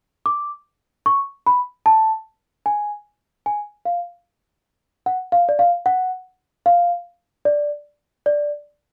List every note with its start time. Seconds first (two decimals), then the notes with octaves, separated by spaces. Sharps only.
0.26 D6
1.06 C#6
1.47 B5
1.86 A5
2.66 G#5
3.46 G#5
3.85 F5
5.06 F#5
5.32 F5
5.49 D5
5.59 F5
5.86 F#5
6.66 F5
7.45 D5
8.26 D5